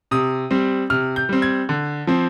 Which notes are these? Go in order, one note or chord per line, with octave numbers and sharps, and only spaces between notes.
C3 D#6
G3 C4
C3 F6
G6
G3 C4
G#6
D3
F3 C4